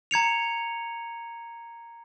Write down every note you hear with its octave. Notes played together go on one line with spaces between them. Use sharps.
A#5 G#6 C#7 F7